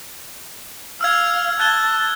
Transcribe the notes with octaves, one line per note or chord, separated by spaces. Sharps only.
F5 E6 F6 G#6
A5 F#6 G#6 G7